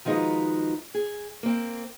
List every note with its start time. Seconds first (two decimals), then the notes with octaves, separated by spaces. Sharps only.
0.05 D#3 F3 G#3 D#4 F#4 B4
0.94 G#4
1.43 A#3 C4